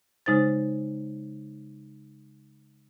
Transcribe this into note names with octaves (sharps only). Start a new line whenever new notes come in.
C#3 G#3 D#4 C5 A6